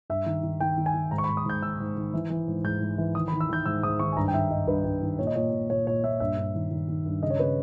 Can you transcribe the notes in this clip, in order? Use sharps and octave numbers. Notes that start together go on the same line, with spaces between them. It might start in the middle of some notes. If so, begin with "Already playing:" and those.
G2 E5
D#3
D#3
D#3 G5
D#3
G#5
D#3
G#2 A#5
C#6
B5
G#2
D#6
G#2 G6
D#3 E6
G#2
D#3
E3
E3
G#2
G#2 G6
G#2
E3
D#3 D#6
B5
D#3
E6
D#3 G6
G#2 E6
G#2 D#6
D#3 C#6
G#5
G2 A#5
G5
D#3 E5
G2 D#5
G2 B4
G2
D#3
A#2 C#5
D#5
A#2 C#5
A#2
A#2 C#5
A#2 C#5
A#2 E5
G2 E5
G2
D#3
D#3
D#3
G2
C#3 D#5
C#5
C#3 B4